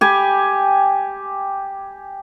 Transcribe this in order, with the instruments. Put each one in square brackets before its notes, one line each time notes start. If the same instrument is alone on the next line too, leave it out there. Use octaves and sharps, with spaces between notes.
[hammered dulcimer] G4 G#5 B5